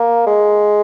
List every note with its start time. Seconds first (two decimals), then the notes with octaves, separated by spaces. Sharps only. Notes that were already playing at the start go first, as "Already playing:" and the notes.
Already playing: A#3
0.26 G#3